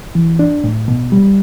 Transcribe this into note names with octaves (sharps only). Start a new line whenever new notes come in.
E3
D4
A2
B2
G3